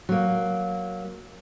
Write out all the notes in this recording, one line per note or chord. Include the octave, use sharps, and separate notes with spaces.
F#3 A#3